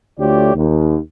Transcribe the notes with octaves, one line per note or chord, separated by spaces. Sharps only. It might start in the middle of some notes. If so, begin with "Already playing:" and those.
D2 A3 F4 G4 C#5 D5
D#2